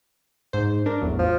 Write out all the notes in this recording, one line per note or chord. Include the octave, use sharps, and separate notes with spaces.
G#2 C5
D4 A#4
A1 E2 F#3
F3